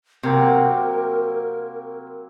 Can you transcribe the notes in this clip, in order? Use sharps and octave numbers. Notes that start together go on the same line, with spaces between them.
C3 F#3 A#3 C4 A#4